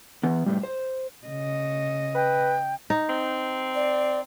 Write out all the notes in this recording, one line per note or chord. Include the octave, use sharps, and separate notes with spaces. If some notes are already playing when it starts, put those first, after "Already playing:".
E3 B3
A2 G3
C5
C#3 D#5
B4 G5
D#4
C4
D5